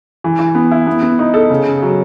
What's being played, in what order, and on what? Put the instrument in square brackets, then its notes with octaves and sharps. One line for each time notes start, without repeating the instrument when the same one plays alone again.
[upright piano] E3
E3
B3
E4
B3
B3
D#4
A4
C#3
C#3
F#3